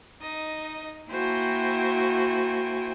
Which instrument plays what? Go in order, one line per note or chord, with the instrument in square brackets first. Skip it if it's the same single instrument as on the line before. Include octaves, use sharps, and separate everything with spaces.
[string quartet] D#4 D#5
A#3 E4 F#4 C5 G5 G#5